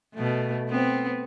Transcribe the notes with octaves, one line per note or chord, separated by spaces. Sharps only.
B2 A3
B3 C4